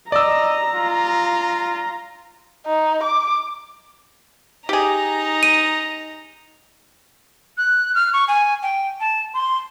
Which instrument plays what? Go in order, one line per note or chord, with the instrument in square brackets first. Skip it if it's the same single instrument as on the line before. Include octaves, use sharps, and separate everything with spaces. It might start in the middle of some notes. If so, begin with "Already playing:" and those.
[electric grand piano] D5 E6 [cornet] D#5 [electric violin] A#5
[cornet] F4
[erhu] D#4
D6
[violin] D#4 A#5 [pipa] G4 G#4
[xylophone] D#7
[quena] F#6
F6
C#6
G#5
G5
A5
C6